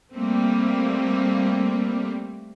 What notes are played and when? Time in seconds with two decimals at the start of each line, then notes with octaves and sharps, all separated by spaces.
0.14 G3 A3 A#3 C4